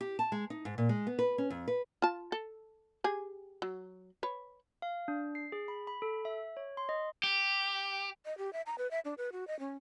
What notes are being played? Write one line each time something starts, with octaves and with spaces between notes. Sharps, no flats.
G4
A5
G#3
D#4
G#2
A#2
G#3
B3
B4
C#4
F2
B4
F4 A5
A4
G4 G#4 G#5
F#3
B4 C#5
F5
D4
C7
G#4
B5
B5
A4
E5
C#5
C6
D#5
G4
D#5
G4
E5
A#5
B4
E5
D4
B4
F#4
D#5
C#4